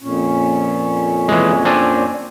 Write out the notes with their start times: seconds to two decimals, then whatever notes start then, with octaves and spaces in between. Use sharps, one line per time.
0.03 F2 A#2 C#4
1.28 E3 G#3
1.65 C4 D4 G#5